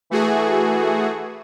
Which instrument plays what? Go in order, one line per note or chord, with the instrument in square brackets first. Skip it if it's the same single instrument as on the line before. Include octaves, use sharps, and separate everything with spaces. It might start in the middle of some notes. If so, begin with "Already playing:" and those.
[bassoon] E3 [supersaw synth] A3 F#4 G#4